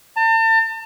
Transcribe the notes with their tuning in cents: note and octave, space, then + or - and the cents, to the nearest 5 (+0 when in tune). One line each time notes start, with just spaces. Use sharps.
A5 +40